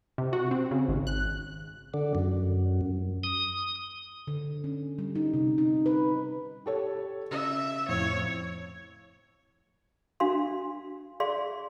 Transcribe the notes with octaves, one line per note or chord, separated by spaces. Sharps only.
C3
F#4
C4
C#3
G#1
F#6
D3
F#2
D#6
D3
C#4
G3
D#4
C3
D#4
B4
G4 A4 C#5
C#3 E5
F2 A2 C#5
D4 F#4 F5 C6
G#4 D5 F5 C6